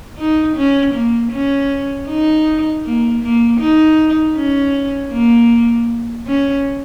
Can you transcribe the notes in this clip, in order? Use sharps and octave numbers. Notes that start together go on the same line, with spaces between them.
D#4
C#4
A#3
C#4
D#4
A#3
A#3
D#4
C#4
A#3
C#4